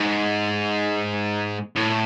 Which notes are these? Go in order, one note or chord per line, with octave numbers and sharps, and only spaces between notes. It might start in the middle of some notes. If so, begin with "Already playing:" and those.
Already playing: G#2
A2